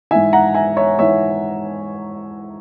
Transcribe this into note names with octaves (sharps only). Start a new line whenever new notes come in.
G#2 E3 E5 G#5
F#5 A#5
E5 G#5
C#5 E5
G#2 E3 C#5 E5